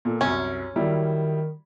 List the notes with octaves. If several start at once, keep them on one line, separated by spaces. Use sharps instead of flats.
A#2 A4
C2 F#2 C#4
D#3 F#3 G3 E4